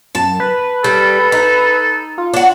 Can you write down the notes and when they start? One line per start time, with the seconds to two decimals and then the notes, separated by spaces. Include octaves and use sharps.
0.15 F#2 A5
0.40 B4
0.84 G3 A4
1.32 D#4
2.18 F4
2.34 D4 F#4